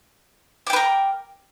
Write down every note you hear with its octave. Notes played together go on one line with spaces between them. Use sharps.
A#4 B4 G5 D6